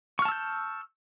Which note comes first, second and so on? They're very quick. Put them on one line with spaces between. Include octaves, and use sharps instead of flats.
C#6 F6 A5 E6 G6